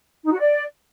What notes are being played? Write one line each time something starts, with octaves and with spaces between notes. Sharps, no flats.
D#4
F#4
D5